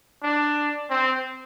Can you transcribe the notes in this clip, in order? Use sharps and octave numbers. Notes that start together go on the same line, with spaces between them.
D4
C4